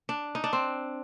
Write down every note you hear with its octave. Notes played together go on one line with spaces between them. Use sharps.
D4
D#4
D4
C4